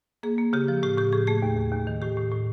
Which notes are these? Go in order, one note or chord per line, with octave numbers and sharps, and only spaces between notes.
A#3 G#4
A#3
C#3 G4
F3
A2 G4
A2 G4
A2 G#4
A3 G#4
D#2
D#2
D#2
D#3
A2 G4
A2
A2